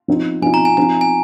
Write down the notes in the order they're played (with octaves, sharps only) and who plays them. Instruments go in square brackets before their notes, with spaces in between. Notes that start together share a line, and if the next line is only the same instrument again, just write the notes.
[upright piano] F3 C4 D#4
[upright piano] F3 C4 D#4 [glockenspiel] G#5
[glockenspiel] A#5
G#5
[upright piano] F3 C4 D#4 [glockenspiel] G#5
[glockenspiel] G#5